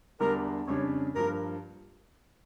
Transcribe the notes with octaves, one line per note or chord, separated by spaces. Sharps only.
E2 D3 G3 D4 A#4
F2 C#3 G3 D4 C#5
G2 F3 A#3 A#4